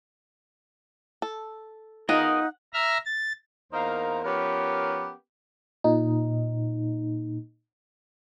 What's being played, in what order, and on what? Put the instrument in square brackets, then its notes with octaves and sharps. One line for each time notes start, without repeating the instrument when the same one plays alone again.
[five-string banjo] A4
[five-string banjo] B3 F4 G#4 [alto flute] D#4 [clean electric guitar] A#4 D#5 [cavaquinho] F#5
[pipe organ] E5 A#5 F6
A6
[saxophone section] E2 A#3 D#4 A#4 C5 F5
F3 B3 C#4 G4 A#4 B4
[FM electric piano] A#2 D#4